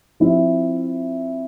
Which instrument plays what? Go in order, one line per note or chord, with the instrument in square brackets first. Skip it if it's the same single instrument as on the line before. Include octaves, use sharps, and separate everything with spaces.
[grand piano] F3 C4 E4